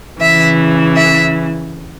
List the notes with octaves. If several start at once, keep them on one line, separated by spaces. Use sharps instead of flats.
C#3 E3 E5
E5